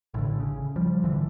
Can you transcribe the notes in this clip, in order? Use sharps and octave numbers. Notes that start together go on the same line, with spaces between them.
A1 A2 D3
C#3
F3 G3
G#1 D3 E3